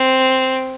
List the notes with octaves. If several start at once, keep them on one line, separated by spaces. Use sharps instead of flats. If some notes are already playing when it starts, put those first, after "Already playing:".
Already playing: C4